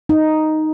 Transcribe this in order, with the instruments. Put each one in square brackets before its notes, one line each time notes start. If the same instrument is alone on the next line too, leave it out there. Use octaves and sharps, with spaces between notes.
[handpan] D#4